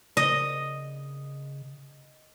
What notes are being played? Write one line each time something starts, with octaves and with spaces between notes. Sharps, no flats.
C#3 D#5